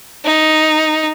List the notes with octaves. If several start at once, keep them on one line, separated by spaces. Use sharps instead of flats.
D#4